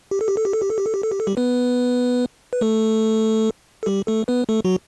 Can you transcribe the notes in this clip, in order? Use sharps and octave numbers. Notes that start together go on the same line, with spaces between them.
G4
A4
G4
A4
G4
A4
G4
A4
G4
A4
G4
A4
G4
A4
G3 G4
B3 B4
B4
A3 A4
A4
G3 G4
A3 A4
B3 B4
A3 A4
F#3 F#4